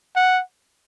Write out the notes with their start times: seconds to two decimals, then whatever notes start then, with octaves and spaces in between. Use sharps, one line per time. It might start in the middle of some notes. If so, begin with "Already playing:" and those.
0.16 F#5